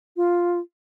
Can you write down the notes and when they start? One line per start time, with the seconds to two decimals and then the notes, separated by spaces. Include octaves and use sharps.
0.17 F4